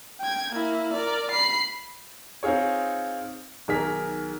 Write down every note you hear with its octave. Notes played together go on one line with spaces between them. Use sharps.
G5 G#6
A#3 E4
A#4 D5
B5 C7
C4 D#4 F4 G#4 C#5
B1 D#3 G#4 A#4 B6